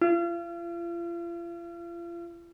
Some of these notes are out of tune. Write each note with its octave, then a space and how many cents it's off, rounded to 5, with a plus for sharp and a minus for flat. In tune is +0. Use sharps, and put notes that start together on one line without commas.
F4 -40